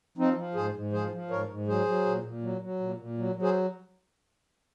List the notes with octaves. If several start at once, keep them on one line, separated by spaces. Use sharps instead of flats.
F3 C4 D#4
F3
G#2 G#4 C5
G#2
F3 G#4 C5
F3
G#2 A#4 C#5
G#2
F#3 G#4 C5
F#3
A#2
A#2
F#3
F#3
A#2
A#2
F#3
F#3
G#4 C5